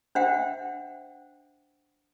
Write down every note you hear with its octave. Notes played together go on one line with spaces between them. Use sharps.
D4 C5 E5 F#5 G5